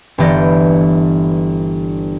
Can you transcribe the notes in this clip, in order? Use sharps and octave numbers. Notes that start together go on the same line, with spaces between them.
G1 E3 B3 D5 G6 A#6